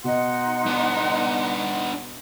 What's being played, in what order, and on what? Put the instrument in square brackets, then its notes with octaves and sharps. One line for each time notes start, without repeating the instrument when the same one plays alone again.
[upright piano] B2 D#5 [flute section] D#4 C6 [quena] F#5
[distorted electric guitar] B3 D4